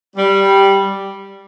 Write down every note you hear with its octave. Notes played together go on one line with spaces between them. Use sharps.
G3